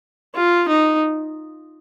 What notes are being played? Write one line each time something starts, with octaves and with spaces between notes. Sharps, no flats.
F4
D#4